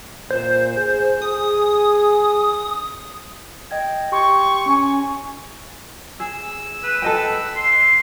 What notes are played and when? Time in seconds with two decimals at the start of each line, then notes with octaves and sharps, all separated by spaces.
0.31 A#2 C5
0.77 G#4
1.22 G#4 D#6
3.71 D#5 G5 G#6
4.12 G4 G5 C6 C#6
4.66 C#4 G#5
6.20 G#4 E6
6.83 B4
7.02 A4 D#5 G5
7.56 C6